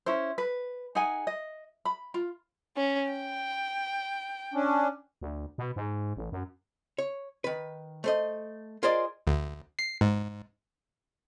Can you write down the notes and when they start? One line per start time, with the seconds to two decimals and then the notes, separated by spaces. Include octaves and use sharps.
0.06 C#4 E4 C5
0.38 B4
0.95 D#4 G#4 F#5 G#5
1.27 D#5
1.85 B5
2.14 F4
2.77 C#4
3.11 G5
4.54 C#4 D4
5.22 D2
5.58 B2
5.76 G#2
6.17 A1
6.32 F#2
6.98 C#5
7.44 D#3 B4
8.04 A3 C5 D#5
8.83 F4 G#4 A#4 C5 D5 D#5
9.27 D2
9.79 C7
10.01 G#2